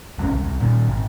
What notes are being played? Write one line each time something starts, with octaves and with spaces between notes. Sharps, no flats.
G#1 G#2 D3 C#4
C2
C2
A#2 D#3
G#1